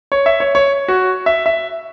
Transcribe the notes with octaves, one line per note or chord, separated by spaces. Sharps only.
C#5
E5
C#5
C#5
F#4
E5
E5